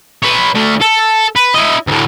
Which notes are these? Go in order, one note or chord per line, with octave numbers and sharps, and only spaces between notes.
B4 C#5
A3 D4
A4
B4
E4 D#5
D2 A2